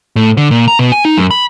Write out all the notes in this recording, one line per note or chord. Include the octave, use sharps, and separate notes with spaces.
A2
D3
A#2
A#5
B2
G#5
D#4
F#2
B5